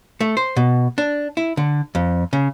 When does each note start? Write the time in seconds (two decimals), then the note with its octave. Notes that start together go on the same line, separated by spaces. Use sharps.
0.21 A3
0.37 C5
0.56 B2
0.98 D4
1.37 E4
1.57 D3
1.95 F2
2.33 C#3